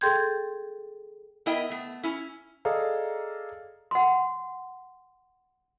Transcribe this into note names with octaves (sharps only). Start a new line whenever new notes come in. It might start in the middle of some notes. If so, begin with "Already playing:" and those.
G#4 A4 G5 C6 G6 G#6
B3 E4 A#4 D#5 E5 G5
A3 B3
C#4 E4
G#4 A4 D5 D#5 F5 A#5
F#5 C6